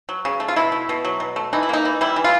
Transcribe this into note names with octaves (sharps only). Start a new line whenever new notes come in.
F#3
C#3
A3
F4
B2 E4
A3
B2
F#3
B2
A3
E3 D#4
E4
A#3 D#4
E3
G3 E4
E3
F4